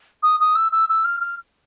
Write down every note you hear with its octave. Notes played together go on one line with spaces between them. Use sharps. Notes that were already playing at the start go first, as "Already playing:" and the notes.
D#6
D#6
E6
E6
E6
F6
F6